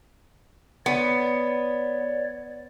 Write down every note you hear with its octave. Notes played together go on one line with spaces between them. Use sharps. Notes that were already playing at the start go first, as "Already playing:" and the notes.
B3 C#5 D5